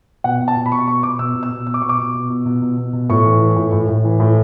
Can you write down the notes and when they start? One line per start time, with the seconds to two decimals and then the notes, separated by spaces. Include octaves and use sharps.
0.24 B2 F#5
0.41 B2
0.48 A5
0.57 B2
0.66 B5
0.72 B2 C#6
0.87 B2 C#6
1.03 B2 D6
1.19 B2 E6
1.35 B2
1.43 E6
1.51 B2
1.67 B2 E6
1.74 D6
1.82 B2 C#6
1.89 D6
1.98 B2
2.14 B2
2.30 B2
2.46 B2
2.62 B2
2.77 B2
2.93 B2
3.10 A2 C#6
3.25 E3
3.41 E3
3.57 A2
3.73 A2
3.89 A2
4.04 E3
4.20 A2